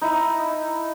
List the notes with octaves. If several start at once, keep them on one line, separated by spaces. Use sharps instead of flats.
D#4 E4